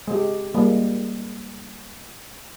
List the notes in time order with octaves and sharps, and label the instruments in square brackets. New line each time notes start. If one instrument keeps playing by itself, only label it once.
[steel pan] G#3 G4
G3 G#3 A#3